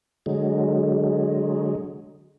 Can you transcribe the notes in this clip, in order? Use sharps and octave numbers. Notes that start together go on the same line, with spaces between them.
D3 F#3 G#3